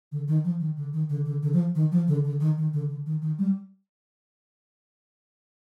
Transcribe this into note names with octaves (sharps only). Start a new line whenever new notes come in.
D3
D#3
F3
D#3
D3
D#3
D3
D3
D3
F3
D#3
F3
D3
D3
D#3
D#3
D3
D3
D#3
D#3
G3